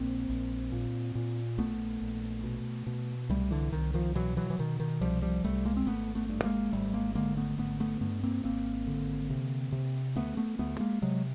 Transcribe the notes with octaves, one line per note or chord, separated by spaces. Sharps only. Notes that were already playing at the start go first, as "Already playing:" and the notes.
Already playing: A#1 A#3 C4
A#1
A#2
A#2
A#1 A3 B3
A#1
B2
B2
C2 G3 A3
D3 E3
C2 D#3
D#3 F3
B2 E3 F#3
E3 F#3
E3
B2 D#3
D#3
C2 F3 G3
F3 G3
C2 G3 A3
G#3 A#3
C4
G#1 A3 B3
A3 B3
G2
G#3 A#3
G#1 G3 A3
G#3 A#3
D3 G#3 A#3
A3 B3
G#1 A3 B3
A3 B3
G2 A3 B3
A#3 C4
G#1 A#3 C4
D3
C3
C3
D2 A3 B3
A3 B3
D2 A3 B3
G#3 A#3
C3 F#3 G#3